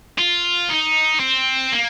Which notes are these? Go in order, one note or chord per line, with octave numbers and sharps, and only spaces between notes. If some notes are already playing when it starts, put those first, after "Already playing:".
F4
D#4
C4
A#3